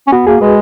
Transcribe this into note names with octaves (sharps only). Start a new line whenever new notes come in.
C#4
B3 F#4
A#3 G#4
G#3 B4